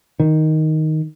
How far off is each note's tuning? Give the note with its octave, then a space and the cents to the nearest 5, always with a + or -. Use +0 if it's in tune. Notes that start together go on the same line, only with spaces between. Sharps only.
D#3 +5